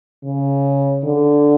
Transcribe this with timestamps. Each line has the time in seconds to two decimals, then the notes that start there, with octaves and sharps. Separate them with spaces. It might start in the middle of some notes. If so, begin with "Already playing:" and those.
0.24 C#3
1.03 D3